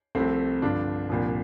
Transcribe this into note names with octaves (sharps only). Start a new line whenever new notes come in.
C2 C3 F3 A3 C4
G2 D3 F3 D4 F4
C2 A#2 F3